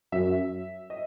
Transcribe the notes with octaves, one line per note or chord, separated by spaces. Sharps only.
F#2 E5
D#5